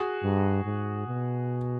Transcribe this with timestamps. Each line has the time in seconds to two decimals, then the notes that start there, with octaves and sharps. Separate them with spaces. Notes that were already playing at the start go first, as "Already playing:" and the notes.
Already playing: F#4 G#4
0.23 G2
0.65 G#2
1.06 B2